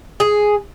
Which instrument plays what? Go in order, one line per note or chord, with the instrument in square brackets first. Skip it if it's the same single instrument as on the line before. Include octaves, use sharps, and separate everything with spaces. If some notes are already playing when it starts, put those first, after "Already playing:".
[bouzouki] G#4